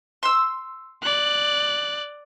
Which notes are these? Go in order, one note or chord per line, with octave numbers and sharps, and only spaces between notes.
C6 E6
D5 F#6